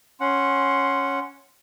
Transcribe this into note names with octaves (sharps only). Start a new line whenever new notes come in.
C#4 F#5 C6